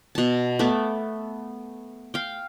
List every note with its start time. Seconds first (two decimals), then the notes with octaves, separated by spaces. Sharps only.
0.15 B2 A5
0.59 A3 B3 E5 D6
2.14 F5 G5